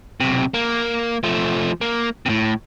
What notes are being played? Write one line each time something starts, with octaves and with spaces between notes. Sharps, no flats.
B1 C3
A#3
F3 A3
A#3
A2 C3